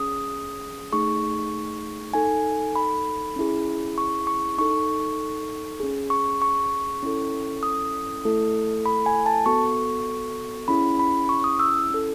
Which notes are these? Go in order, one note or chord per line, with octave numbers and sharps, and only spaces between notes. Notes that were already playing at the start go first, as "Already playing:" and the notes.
Already playing: C#4 G#4 D#6
A3 D#4 G#4 C#6
D#4 A4 G#5
B5
C#4 E4 G#4
C#6
C#6
D#4 A4 C#6
C#4 G#4
C#6
C#6
C#4 E4 A4
D#6
A3 E4 A4
B5
G#5
A5
B3 F#4 A4 C#6
C#4 E4 G#4 B5
B5
C#6
D#6
E6
C#4 E4 A4